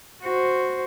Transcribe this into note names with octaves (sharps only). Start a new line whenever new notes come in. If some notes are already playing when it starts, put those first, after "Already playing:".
F#4 C5